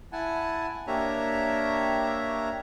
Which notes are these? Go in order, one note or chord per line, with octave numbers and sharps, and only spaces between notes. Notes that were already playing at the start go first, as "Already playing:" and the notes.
E4 F#5 G#5 A5
A#3 D4 G4 C#5 E5 A#5